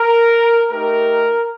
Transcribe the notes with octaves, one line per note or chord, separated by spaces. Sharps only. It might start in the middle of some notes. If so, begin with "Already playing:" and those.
Already playing: A#4
A3 D#4 G4 A#4